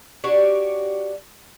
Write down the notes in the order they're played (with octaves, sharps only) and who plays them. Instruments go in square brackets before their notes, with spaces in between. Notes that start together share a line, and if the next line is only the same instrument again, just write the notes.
[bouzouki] D4 F#4 G4 C#5